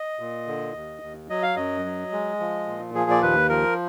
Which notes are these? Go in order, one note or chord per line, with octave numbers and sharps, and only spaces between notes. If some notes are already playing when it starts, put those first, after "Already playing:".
Already playing: D#5
A#2
D3
D#2
D#2
F#3 D#5
F5
F#2 D#5
F#3
G#3
F3
A#2
F3 G#4
D5
D#2 B4
F3 A#4